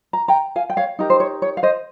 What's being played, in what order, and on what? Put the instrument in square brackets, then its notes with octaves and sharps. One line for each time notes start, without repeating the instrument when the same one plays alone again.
[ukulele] A#5
G5 A#5
F5 G#5
G5
C#5 F5
D#4 G4 A#4
C5
C#5
C#5
F5
C5 D#5